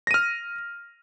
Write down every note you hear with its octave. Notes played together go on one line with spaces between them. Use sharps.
F6 A#6 D#7